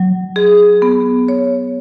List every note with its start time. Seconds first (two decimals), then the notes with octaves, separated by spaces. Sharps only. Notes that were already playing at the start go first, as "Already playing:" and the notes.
Already playing: F#3
0.36 G#4
0.82 B3
1.28 C#5